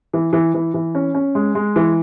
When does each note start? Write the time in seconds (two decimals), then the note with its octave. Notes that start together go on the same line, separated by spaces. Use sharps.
0.13 E3
0.33 E3
0.54 E3
0.74 E3
0.95 C#4
1.15 C#4
1.35 G#3
1.55 G#3
1.76 E3